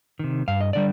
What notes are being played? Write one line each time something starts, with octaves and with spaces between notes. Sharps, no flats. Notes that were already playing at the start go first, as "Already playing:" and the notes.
C3 D#3
G2 F5
D#5
D3 G3 D5